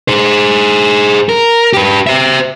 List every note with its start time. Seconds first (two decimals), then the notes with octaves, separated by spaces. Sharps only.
0.08 G#4 C5
1.29 A#4
1.73 G4 B4
2.07 C5 E5